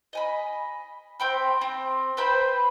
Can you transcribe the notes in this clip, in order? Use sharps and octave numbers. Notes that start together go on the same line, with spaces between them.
D#5 G#5 B5
C4 G5 B5
C4
B4 C5 G5 B5